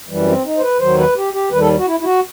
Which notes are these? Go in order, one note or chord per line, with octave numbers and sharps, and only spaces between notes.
F#2 E3 G3
C4
D#4
C5
B4
D#2 D#3 F#3 C5
B4
G4
G4
D#2 D#3 G3 B4
A4
F#4
E4
E4
F#4